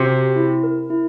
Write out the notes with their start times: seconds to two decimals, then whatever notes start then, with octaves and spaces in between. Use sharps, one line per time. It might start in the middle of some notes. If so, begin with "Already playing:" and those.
Already playing: C3 F#4
0.09 G4
0.36 E4
0.64 A#4
0.90 E4